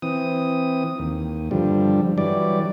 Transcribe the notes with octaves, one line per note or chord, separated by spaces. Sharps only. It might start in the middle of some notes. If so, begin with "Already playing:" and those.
E3 C4 D#6
D#2
G2 D3 F3 G3
E3 F#3 G3 D5